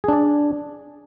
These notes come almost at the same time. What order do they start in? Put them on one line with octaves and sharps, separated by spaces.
G#4 D4 D5